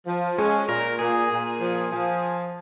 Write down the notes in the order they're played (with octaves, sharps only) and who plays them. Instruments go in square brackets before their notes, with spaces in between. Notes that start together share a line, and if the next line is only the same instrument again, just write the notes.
[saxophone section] F3
[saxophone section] G#3 [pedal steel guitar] C#4
[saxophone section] A#2 [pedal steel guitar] A#4
[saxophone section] A#2 [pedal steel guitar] G#4
[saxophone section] A#2
F3
F3